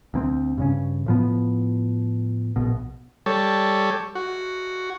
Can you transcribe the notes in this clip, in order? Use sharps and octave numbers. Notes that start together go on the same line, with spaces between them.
D2 A#3 C4
G2 C#3 C#4
A2 F3 B3
A#1 B2
G3 A4 C#5
F#4